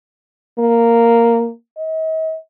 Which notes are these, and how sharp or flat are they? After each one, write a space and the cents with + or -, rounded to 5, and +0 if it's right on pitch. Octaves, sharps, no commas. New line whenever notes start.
A#3 -5
D#5 +45